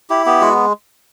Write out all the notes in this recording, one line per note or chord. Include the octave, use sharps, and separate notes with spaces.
E4 G4
B3 G4
G#3 F#4